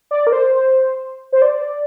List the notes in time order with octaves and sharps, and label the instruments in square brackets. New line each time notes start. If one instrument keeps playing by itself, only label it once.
[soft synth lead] D5
A#4
C5
C5
C5
D5